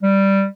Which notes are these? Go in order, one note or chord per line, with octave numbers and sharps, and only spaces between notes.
G3